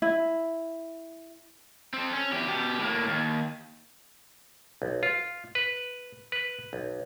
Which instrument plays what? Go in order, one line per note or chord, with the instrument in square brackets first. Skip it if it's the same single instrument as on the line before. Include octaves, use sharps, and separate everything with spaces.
[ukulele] E4
[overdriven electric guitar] C4 A4
C#4
E2 G4
B2 G4
A2 A#3
D#2
[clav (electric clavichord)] B1
F4
B4
B4
B1